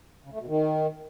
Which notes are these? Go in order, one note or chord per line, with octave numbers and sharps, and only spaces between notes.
C#3
A3
B2
D#3